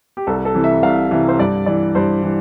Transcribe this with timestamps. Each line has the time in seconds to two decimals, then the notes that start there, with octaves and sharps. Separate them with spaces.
0.17 G4
0.27 C2 A4
0.45 A4
0.55 C3 E3
0.64 E5
0.83 C2 F5
1.11 C3 E3 E5
1.29 C5
1.39 G2 D5
1.66 E3 D5
1.95 G2 C5
2.23 E3